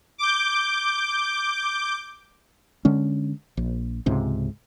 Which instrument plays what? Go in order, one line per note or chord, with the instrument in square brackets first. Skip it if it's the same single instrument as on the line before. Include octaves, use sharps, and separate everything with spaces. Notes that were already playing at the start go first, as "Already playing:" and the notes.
[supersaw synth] D6 G6
[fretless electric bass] D3 G#3 C#4
A#1
C#2 G#2 C3